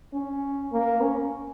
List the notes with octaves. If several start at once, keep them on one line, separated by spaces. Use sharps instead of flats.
C#4
A#3
C#4